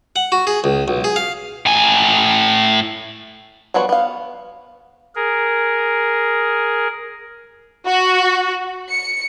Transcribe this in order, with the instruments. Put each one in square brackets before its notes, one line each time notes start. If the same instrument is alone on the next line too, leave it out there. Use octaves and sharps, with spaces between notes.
[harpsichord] F#5
F#4
G#4
C#2
B1
G#4
F5
[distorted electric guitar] A2 G#5
[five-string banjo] F3 G3 B3 F#4 C#5
B3 F5
[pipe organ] G#4 A#4
[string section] F#4
C#7